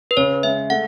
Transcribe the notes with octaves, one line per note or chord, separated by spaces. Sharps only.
B4
C#3 C#5
G#3 E5
A3 F#5